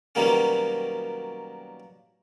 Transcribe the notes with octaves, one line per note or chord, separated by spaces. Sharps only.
B2 D#3 F#3 G3 A#3 C#4